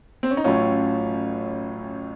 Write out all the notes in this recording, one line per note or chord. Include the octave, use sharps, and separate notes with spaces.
C4
C#4
D#4
A1 A2 F#3 A3 C#4 F4